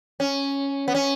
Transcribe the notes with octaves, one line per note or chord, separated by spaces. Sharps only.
C#4
B3
C#4